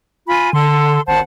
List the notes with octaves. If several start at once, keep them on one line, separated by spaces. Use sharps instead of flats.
F4 G#5 B5
D3 A4 C6
G#1 C5 F#5 A5